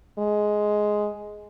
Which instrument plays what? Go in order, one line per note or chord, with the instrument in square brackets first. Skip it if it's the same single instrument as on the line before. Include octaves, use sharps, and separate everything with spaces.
[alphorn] G#3